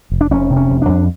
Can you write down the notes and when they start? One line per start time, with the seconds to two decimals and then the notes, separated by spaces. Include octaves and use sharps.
0.12 F1
0.21 D4
0.31 F1 C#4
0.50 C3
0.56 C#4
0.70 F1
0.82 D4
0.89 F2